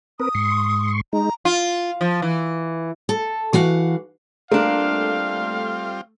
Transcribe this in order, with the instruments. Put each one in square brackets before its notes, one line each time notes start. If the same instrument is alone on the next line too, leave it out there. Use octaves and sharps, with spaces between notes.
[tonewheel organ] C4 A#4 B4 [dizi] D#6
[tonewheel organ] G#2 C6 C#6
[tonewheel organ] G#3 D#4 [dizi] A#5
[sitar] F4
F3
E3
[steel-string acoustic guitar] A4
E3 F#4 F5 F#5
[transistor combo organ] G3 C4 F4 [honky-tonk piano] A3 [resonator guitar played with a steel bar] A#3 D4 [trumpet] F5